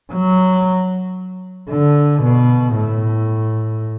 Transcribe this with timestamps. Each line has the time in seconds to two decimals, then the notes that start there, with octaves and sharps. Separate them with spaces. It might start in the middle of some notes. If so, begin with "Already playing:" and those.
0.12 F#3
1.70 D3
2.23 B2
2.76 A2